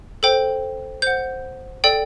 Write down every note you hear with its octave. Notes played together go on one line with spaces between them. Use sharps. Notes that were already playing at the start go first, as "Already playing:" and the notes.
A4 C5 G5
C5 F#5 G6
A4 D5 G5